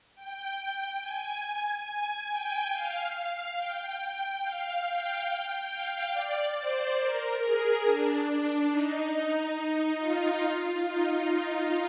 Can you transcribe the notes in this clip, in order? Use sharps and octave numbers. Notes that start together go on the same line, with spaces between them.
G5
G#5
G5
F5
G5
F5
G5
G5
F5
D5
C5
A#4
G#4
D4
D4
D#4
F4
F4
D#4